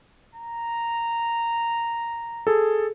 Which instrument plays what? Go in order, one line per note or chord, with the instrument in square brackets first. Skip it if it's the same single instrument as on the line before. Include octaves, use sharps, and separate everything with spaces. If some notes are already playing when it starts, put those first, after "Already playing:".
[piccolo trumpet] A#5
[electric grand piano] G#4 A4